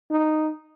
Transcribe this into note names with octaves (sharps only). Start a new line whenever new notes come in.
D#4